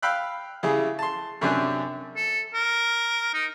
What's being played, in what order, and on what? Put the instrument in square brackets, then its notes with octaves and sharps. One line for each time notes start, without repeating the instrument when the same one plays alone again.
[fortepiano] F5 G5 B5 E6 F#6
C#3 G3 E4 G#4
A5 C6
F#2 C3 D4 G#5 F#6
[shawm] A4
A#4
D#4